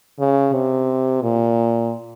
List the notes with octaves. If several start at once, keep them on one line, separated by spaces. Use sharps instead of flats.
C#3
C3
A#2